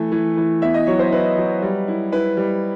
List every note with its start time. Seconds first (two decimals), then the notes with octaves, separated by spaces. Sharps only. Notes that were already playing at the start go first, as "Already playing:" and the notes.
Already playing: E3 A3
0.12 E3
0.37 E3
0.62 B3 E5
0.74 D#5
0.87 F#3 C#5
0.99 C5
1.12 E4 B4
1.37 F#3
1.62 G3
1.88 E4
2.12 E4 B4
2.37 G3